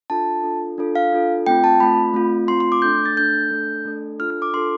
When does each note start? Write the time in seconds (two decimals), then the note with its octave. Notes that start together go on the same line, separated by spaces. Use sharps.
0.10 D4 F4 A4 A5
0.43 D4 F4 A4
0.78 D4 F4 A4
0.95 F5
1.12 D4 F4 A4
1.46 A3 C4 F4 G5
1.64 A5
1.80 A3 C4 F4 B5
2.14 A3 C4 F4
2.48 A3 C4 F4 C6
2.60 C6
2.72 D6
2.82 A3 D4 A4 G6
3.06 A6
3.16 A3 D4 A4 G6
3.51 A3 D4 A4
3.85 A3 D4 A4
4.19 D4 F4 A4 F6
4.30 F6
4.42 D6
4.53 D4 F4 A4 C6